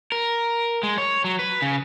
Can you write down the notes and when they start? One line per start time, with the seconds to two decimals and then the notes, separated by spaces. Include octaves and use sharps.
0.12 A#4
0.83 G#3
0.98 C#5
1.24 F#3
1.39 B4
1.62 C#3